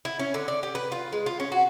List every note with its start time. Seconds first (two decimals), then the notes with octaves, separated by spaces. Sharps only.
0.05 E4
0.19 C#4
0.34 D3
0.48 D5
0.63 G4
0.75 B4
0.92 F4
1.12 G#3
1.26 F4
1.40 C#4
1.52 F#4